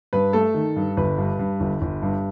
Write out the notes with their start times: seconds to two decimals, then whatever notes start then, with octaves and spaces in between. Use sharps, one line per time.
0.13 G2 B4
0.33 A3 A4
0.54 D#3
0.76 G2
0.97 G1 B4
1.18 G2
1.39 G2
1.60 G1
1.81 G1
2.02 G2